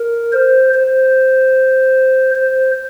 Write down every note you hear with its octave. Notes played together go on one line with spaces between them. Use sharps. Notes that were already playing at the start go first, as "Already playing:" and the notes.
Already playing: A#4
C5
C5
C5